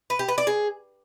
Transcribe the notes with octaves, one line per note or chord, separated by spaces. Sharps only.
B4
G4
B4
D5
G#4